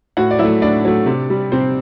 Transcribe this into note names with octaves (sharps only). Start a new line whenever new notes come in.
A2 F#4 F#5
D5
F#3 E4 E5
A3
A2 D4 D5
F#3 A3
C3
G3
C3 C4 C5